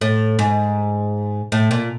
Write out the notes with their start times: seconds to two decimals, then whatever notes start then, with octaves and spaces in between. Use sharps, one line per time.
0.01 A2
0.39 G#2
1.52 A2
1.71 A#2